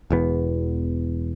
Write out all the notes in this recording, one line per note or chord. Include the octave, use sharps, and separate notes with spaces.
E1 E2 B3